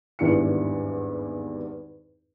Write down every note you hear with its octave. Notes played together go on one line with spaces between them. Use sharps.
G#1 E2 G2 E4 C#7